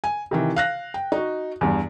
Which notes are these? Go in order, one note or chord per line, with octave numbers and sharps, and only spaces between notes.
G#5
C3 D#3 E3
F5 F#6 A#6
G5
D#4 F#4
E2 G2